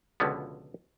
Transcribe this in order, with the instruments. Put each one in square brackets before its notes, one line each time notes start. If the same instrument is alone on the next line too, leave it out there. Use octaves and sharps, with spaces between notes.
[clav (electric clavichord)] C#2 B2 D3 F3 B3